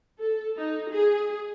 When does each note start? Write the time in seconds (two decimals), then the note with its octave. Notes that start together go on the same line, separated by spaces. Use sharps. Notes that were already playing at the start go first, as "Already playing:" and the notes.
0.20 A4
0.57 D#4
0.91 G#4